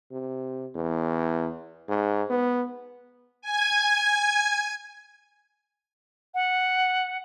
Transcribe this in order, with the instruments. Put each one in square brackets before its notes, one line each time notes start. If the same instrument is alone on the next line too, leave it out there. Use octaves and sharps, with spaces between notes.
[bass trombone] C3
E2
G#2
B3
[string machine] G#5 G#6
[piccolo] F#5